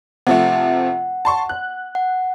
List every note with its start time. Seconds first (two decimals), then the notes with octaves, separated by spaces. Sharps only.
0.27 C3 F3 A3 F#5
1.25 A5 C6 C#6
1.49 F#6
1.95 F#5